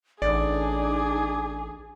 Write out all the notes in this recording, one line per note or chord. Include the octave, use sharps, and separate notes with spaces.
A1 D4 D#4 G#4 D5 D6